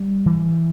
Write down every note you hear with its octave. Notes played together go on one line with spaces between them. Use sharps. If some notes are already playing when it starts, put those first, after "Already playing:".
Already playing: G3
E3